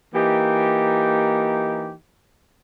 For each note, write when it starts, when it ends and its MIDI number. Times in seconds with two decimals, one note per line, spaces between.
0.15 1.93 52
0.15 1.93 58
0.15 1.93 63
0.15 1.93 67